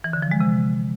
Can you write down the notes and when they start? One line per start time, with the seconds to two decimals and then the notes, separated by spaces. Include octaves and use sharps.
0.04 E3
0.13 D3
0.22 F3
0.31 G#3
0.40 C3